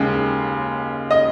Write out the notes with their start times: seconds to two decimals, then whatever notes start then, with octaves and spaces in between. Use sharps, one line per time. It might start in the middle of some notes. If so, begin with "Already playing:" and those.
Already playing: D#2 C#3 G#3
1.11 D#5